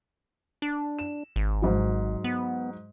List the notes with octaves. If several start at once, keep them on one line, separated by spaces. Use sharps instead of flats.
D4
E7
G#1
G#2 F#3
B3